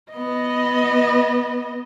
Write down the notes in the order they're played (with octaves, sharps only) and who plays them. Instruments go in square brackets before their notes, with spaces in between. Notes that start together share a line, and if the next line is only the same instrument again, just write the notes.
[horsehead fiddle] B3 D#5